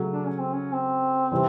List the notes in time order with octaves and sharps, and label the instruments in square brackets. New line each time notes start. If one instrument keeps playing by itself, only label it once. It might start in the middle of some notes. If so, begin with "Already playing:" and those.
Already playing: [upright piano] C#3 F#3 A3
[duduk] D4
C#4
C4
C#4
C4
[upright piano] C3 E3 G3